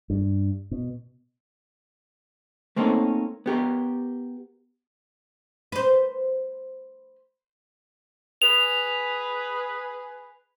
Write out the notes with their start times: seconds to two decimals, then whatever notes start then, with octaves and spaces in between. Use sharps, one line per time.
0.10 G2
0.71 B2
2.76 A3 A#3 C4 C#4 D#4 A#4
3.46 B3 G4 A#4
5.72 B4 C5
8.42 G#4 B4 F7